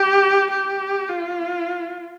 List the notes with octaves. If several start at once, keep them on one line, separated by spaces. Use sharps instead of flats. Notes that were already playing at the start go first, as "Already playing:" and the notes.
Already playing: G4
G4
F4